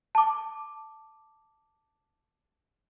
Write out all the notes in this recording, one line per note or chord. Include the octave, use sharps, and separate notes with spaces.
A5 D6